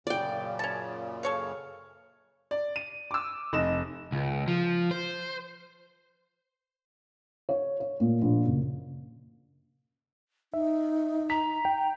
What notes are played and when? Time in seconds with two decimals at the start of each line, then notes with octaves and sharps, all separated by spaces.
0.07 F#2 A#2 C#3 D5 G5
0.59 C#4 A5
1.23 A4 C#5 F5
2.51 D5
2.76 D#7
3.11 D6 E6
3.53 F1 D#5 E7
4.12 C#2
4.48 F3
4.91 C5
7.49 C#5
7.80 C#5
8.00 A#2
8.22 A#1
8.46 F#1
10.53 D#4 E5
11.30 A#5 B6
11.65 G5